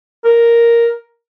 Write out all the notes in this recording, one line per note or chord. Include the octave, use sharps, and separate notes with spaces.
A#4